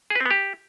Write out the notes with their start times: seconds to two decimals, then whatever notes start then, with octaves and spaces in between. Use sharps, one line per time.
0.10 G#4
0.15 B4
0.20 C4
0.26 B3
0.31 G4